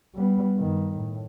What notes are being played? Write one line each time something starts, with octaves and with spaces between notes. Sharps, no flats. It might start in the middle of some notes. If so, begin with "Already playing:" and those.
G3 B3
G2 D#3
A2